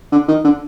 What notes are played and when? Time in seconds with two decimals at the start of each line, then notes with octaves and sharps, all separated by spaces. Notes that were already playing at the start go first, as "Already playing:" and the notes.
0.12 D3
0.28 D#3
0.44 D3